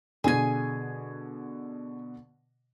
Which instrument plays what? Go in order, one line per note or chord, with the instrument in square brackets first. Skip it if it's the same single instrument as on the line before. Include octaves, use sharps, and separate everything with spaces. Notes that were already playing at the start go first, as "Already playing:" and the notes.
[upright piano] B2 D3 [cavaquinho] G#4 G#5